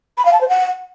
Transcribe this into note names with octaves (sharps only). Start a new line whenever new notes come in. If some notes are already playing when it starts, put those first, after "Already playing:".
B5
F5
A5
C5
F#5